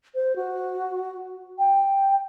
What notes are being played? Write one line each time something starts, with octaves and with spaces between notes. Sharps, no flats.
C5
F#4
G5